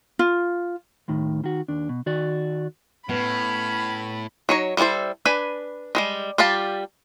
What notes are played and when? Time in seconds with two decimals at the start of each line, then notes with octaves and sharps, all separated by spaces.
0.19 F4
1.08 D#2 A2 D#3
1.44 D#3 F#4
1.68 D#2 D4
1.89 B2
2.06 D#3 F#4 D5
3.09 A2 B3 C#4 B5
4.49 F#3 D#4 C#5
4.77 G3 B3 E4 A4 C5
5.25 D4 B4 G#5 B5
5.95 G3 G#3 D#4
6.38 G3 F4 G4 F5 A5